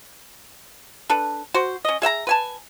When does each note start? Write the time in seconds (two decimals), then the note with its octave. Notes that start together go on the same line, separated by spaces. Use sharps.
1.10 D4 A4 B4
1.54 F#4 C5
1.85 C#4 D#5
2.02 G#4 E5 G5 A#5
2.27 B4 G#5 A5